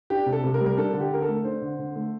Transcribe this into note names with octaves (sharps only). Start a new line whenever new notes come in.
D4 G4
C3
A4
C3
A#4
G3
A#4
D4 A4
D3
G4
D3 A#4
A4
A3
D4 C5
D3
D3
A3